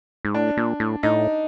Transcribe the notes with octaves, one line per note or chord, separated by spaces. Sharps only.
G#2
A2 D4
A#2
A2
A2 D#4